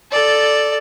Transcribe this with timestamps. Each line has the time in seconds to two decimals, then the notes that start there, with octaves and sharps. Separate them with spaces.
0.12 A4 D5